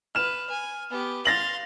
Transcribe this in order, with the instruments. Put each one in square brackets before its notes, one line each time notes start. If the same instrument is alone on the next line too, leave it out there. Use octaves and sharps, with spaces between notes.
[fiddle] B4 [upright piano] F6 E7
[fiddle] G#5
B3 G4
[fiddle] F5 C6 [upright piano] A6 A#6 F#7